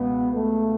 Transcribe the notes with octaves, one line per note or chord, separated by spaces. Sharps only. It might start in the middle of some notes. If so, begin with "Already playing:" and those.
Already playing: C#2 B2 B3
A3